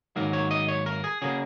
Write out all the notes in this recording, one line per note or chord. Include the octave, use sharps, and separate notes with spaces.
G#2 D#3 F#3 A#3 A#4
C#5
D#5
C#5
A#4
G#4
C#3 F#3 A#3 G#4